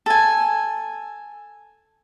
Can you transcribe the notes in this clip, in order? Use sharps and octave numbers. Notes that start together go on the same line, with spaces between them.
A4 G#5